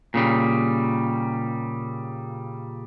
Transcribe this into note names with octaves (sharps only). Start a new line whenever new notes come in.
A#2 C#3 G3